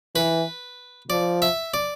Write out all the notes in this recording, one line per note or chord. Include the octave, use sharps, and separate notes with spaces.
E3 B4
F3 D5
E5
D5